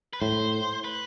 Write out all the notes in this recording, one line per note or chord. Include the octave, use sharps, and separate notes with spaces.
B4
A2 C5
B4